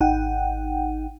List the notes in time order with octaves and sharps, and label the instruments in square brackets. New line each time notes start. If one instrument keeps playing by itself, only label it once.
[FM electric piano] G#1 D#4 F#5 G5